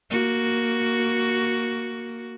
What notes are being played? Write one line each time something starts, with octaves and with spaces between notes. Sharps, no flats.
A#3 F#4